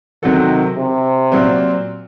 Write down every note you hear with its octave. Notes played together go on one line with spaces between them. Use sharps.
C3 D#3 F#3 C4 F#4 A4
C3
A#2 F#3 C4